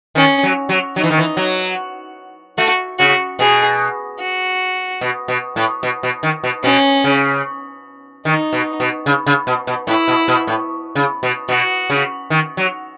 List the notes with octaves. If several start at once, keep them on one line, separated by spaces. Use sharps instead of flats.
D#3 C#4
F#3
F#3
F#3 D#4
E3
D#3
E3
F#3
A3 F#4
C#3 F#4
B2 G#4
F#4
B2
B2
A2
B2
B2
D#3
B2
B2 C#4
C#3
D#3 D#4
B2
B2
C#3
C#3
B2
B2
A2 E4
B2
B2
A2
C#3
B2
B2 F#4
C#3
D#3
F#3